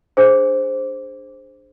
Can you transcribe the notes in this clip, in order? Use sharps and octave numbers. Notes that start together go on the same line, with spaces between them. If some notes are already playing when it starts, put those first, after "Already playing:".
D4 G#4 C5